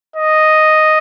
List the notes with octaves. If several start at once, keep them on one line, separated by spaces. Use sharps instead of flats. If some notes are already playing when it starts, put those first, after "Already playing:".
D#5